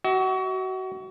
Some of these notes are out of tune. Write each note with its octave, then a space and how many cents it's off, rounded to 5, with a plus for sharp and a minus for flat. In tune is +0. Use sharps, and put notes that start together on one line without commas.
F#4 +25 E5 -35